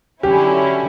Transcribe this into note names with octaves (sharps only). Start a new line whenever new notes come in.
D3 F#3 C#4 E4 G4